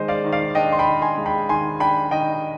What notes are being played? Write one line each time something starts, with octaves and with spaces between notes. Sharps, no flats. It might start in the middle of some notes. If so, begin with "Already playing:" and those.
Already playing: D#3 G#3 C5 D#5
D5 F5
D#3
D5 F5
D4 D#5 G5
C6
G5 B5
D#3
G#5 C6
G#3
G5 B5
D#3 G#5 C6
D4 G5 B5
D#3 D#5 G5